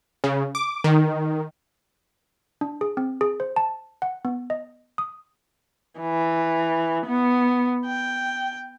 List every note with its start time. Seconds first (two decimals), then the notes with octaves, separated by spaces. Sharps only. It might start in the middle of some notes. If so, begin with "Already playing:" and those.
0.24 C#3
0.55 D6
0.84 D#3
2.61 D4
2.81 G#4
2.97 C4
3.21 G#4
3.40 C5
3.56 A5
4.02 F#5
4.25 B3
4.50 D#5
4.98 D#6
6.00 E3
7.06 B3
7.86 G5